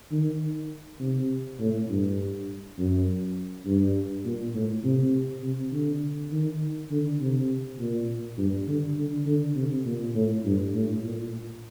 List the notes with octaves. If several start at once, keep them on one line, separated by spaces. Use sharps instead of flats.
D#3
C3
A2
G2
F#2
G2
A#2
A2
C3
C3
D3
D#3
D3
C3
A#2
G2
D3
D3
D3
C3
A#2
A2
G2
A2
A#2